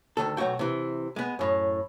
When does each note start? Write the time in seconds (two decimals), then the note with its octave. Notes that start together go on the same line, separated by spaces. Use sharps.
0.17 D2 G2 D#3 A4
0.37 B1 F#3 A3 F#4 G5
0.59 C3 E3
1.16 G#3 B3
1.39 F#2 A2